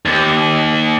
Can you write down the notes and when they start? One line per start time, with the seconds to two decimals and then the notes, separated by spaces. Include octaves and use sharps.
0.06 D#2